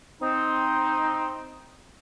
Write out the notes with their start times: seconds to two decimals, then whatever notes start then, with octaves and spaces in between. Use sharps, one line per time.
0.21 C4 D#4